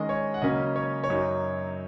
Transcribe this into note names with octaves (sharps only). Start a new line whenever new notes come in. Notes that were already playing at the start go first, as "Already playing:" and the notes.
Already playing: D#3 G#3 C#4 D#5
C#5
F#5
C#3 F#3 A#3 C#4 D#5
C#5
C#5
F#2 F#3 D#4